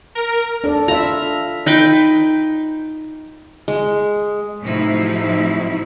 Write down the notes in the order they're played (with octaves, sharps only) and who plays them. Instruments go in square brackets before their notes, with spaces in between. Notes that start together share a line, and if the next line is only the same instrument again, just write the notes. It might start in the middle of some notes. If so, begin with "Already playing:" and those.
[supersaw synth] A#4
[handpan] D4 A4 D5
[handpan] F4 E5 [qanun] A#5
[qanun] D#4 B4 G5
G#3
[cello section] A2 C3 F3 F#3 D#4 E4